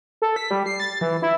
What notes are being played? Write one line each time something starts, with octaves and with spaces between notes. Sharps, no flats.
A4
B6
G3
C7
A6
E3
E4